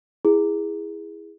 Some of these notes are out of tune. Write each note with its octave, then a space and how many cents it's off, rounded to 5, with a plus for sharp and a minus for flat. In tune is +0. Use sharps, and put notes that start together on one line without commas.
E4 +0 G#4 -10